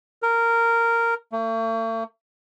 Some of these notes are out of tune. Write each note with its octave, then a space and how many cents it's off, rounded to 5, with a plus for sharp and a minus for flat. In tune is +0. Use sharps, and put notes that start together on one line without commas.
A#4 -10
A3 +45